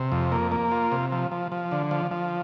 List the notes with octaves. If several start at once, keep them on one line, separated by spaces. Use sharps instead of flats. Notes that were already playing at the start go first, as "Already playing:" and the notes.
Already playing: C3
F2
A#3
A#3
F4
C3
F3
F3
F3
D3
F3
F3